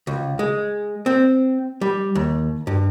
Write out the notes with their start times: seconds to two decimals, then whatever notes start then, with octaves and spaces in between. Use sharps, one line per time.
0.07 C#2
0.39 G#3
1.06 C4
1.81 G3
2.15 D#2
2.67 G2